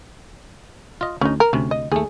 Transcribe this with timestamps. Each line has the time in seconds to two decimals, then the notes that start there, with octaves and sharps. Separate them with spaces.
1.01 F4 D#5
1.21 D2 C#4 D#4
1.40 A#4
1.53 D2 C3 C#4
1.71 D#5
1.92 D#2 A3 G#4